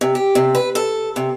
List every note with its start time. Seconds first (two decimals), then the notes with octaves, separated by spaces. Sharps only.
0.01 C3
0.15 G4
0.35 C3
0.55 B4
0.75 A4
1.16 C3